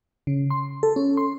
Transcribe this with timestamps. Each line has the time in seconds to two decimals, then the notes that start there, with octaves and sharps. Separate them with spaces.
0.27 C#3
0.50 C6
0.83 A4
0.96 C#4
1.17 C6